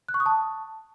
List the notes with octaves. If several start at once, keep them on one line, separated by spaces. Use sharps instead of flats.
F#6
C#6
D#6
A5